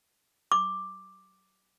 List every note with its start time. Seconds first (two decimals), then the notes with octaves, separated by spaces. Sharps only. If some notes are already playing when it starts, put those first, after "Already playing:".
0.52 D6